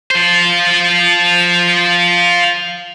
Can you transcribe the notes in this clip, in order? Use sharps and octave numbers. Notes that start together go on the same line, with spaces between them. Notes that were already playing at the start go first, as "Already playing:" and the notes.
F3 C5